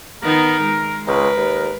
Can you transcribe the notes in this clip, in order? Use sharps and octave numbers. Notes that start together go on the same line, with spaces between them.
D#3 B3 D#4 A#4
G#3
C#2 A#4 B4
D#2